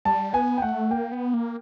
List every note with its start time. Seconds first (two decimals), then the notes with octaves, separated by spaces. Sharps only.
0.05 G3 A5
0.33 B3 G#5
0.58 G5
0.62 A3 F#5
0.91 A#3 G5
1.12 B3
1.34 A#3